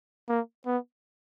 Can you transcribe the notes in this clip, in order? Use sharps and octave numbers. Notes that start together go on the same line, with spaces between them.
A#3
B3